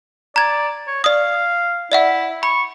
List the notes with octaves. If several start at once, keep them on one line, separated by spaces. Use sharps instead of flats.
D5 A#5 G#6
C#5
D5 F5 D#6
E4 D5 E5 F#5
B5 C#6